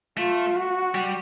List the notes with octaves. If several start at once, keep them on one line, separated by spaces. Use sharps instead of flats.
A3 F4
F#4
G3